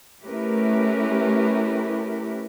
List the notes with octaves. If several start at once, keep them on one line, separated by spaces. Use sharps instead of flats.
A3 C#4 E4 G4 A#4 B4